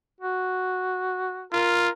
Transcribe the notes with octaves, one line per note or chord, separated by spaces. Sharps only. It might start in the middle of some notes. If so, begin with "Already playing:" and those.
F#4
F4 A#4